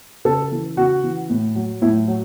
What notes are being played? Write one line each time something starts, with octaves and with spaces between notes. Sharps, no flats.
C#3 A4
E3
C#3 F#4
E3
A2
F#3
A2 E4
F#3